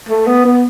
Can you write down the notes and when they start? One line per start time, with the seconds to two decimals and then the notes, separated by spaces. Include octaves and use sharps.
0.09 A3
0.27 B3
0.45 B3